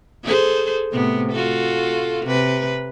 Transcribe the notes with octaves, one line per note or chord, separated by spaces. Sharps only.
G#4 A4 C5
A2 C3 B3
F4 F#4 A4
C3 B4